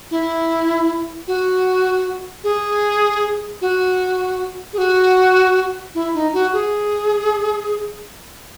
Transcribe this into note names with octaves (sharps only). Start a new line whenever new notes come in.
E4
F#4
G#4
F#4
G#4
F#4
E4
D#4
F#4
G#4